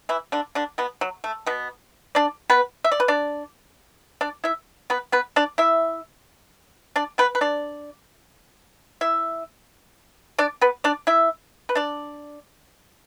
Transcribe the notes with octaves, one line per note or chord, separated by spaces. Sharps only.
E3 E4
D3 D4
D3 D4
B2 B3
F#3
A3
B2 B3
D4 D5
B3 B4
E5
D5
B4
D4 D5
D4 D5
E4 E5
B3 B4
B3 B4
D4 D5
E4 E5
D4 D5
B3 B4
B4
D4 D5
E4 E5
D4 D5
B3 B4
D4 D5
E4 E5
B4
D4 D5